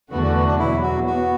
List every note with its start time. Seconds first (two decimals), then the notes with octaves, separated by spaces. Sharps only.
0.11 E2 D3 A3 B3 F#4
0.23 D4
0.35 B3
0.47 D4
0.59 E2 B2 F#3 E4
0.83 F#4
1.07 B3 F#4